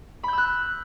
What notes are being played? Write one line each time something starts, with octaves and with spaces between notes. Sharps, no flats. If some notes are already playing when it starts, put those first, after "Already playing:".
B5 E6 F#6 G6